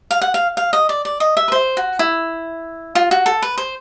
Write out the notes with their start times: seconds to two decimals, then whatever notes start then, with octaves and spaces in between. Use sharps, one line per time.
0.11 F5
0.21 F#5
0.34 F5
0.57 F5
0.73 D#5
0.89 D5
1.05 D5
1.20 D#5
1.37 E5
1.48 B4
1.52 C5
1.77 F#4
1.99 E4
2.95 F4
3.11 F#4
3.26 A4
3.42 B4
3.58 C5